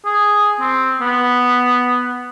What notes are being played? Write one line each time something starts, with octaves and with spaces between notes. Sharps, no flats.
G#4
C4
B3